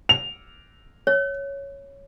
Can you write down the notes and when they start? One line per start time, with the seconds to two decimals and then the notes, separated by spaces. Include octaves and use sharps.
0.09 F7
1.07 C#5